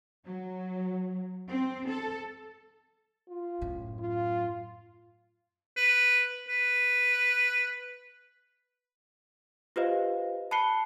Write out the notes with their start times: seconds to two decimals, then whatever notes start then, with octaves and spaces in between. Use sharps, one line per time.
0.25 F#3
1.49 C4
1.90 A4
3.29 F4
3.61 F#2 A2
3.99 F4
5.77 B4
6.48 B4
9.76 F4 G4 B4 C5 D#5 F5
10.51 A5 B5 F#6 C7 C#7 G7